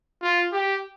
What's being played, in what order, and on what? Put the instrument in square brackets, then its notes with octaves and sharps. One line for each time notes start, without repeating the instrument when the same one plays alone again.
[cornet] F4
G4